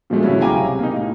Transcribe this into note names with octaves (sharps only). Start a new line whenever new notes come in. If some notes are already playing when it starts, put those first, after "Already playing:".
A#2 F3 F#3 G#3 A3
G2 C#3 A3 C#4 E4 F#4
B1 F5 G5 G#5 A#5 D6
C3
A#3 D#4
A2